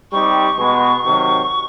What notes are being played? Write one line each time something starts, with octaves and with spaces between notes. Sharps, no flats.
G3 C4 D#4 G4 C#6
B2 G#3 B3
C3 D#3 F#3